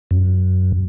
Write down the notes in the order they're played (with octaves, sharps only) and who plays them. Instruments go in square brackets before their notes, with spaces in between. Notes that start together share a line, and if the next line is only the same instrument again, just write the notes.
[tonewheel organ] F#2